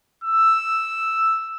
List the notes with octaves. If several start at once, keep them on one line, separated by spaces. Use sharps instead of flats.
E6